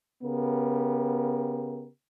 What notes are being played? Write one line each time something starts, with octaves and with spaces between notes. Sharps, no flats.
C#3 B3 G4 A#4